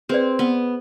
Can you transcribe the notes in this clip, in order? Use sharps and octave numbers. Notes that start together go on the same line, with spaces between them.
C4 G#4 B4 D5
B3